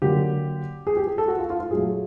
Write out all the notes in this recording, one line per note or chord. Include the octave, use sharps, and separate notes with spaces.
D3 F#3 A#3 G4
G#4
G4
G#4
A4
F#4
F4
F4
F4
A#2 F#3 A3 G#4